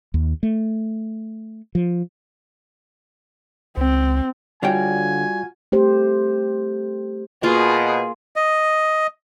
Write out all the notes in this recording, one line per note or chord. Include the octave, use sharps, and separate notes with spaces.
D#2
A3
F3
C#2 C4
D3 G3 F4 F#4 C#5 G5 G#5
A3 G4 C5
B2 A#3 F4 G#4
D#5